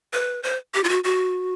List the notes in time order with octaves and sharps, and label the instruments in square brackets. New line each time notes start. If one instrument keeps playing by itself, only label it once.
[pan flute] B4
C5
G4
F4
F#4
F#4